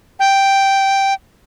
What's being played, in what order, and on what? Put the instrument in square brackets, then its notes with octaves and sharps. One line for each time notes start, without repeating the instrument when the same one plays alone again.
[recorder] G5